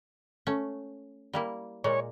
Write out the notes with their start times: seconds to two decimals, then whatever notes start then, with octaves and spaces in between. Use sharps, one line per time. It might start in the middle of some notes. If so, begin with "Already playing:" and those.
0.47 A3 C#4
1.33 G3 A#3 E4
1.84 A#2 G#3 A#3 C#5